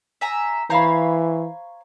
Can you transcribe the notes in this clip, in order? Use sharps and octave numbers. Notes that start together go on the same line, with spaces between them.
E5 G#5 A#5
E3 C5 C#5 F5 A#5 B5